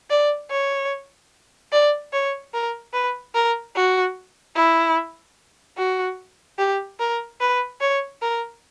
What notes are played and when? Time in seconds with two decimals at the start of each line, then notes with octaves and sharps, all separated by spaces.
0.10 D5
0.51 C#5
1.72 D5
2.13 C#5
2.53 A#4
2.93 B4
3.35 A#4
3.76 F#4
4.56 E4
5.78 F#4
6.59 G4
7.00 A#4
7.41 B4
7.81 C#5
8.22 A#4